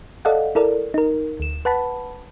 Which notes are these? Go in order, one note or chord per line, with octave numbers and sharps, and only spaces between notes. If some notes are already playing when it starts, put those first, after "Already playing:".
A4 D5 D#5 F5 F#5
E4 A4 A#4 D5
D#4 A#4
D2 E7
B4 F#5 A5 B5